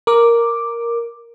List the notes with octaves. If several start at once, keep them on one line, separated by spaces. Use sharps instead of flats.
A#4 D6